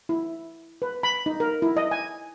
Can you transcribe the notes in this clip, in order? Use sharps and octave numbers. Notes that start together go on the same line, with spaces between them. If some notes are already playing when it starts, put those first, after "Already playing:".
E4
B4
B5
D#4
A#4
E4
D#5
G#5